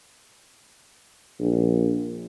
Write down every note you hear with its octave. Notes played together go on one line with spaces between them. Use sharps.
A#1